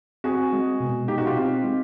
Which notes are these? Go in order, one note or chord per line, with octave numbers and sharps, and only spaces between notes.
C4 F#4 G#4
G#3
B2
D#4 G4
F#4
F4 G4
C4
G#3